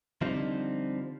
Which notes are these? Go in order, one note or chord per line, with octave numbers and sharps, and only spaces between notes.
D3 F3 G3 C4 D#4